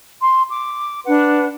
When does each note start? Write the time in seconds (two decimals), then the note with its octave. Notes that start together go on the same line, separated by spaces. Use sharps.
0.22 C6
0.48 D6
1.05 D4 B4 F#5